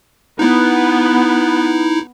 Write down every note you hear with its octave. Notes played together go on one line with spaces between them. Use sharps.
B3 D#4 E4